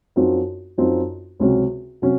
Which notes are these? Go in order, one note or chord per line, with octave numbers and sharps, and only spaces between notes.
F#2 F3 C4 D#4 F#4
F#2 F3 C4 D#4 F#4
C#2 C3 F#3 C#4 F#4
C3 F#3 C#4 F#4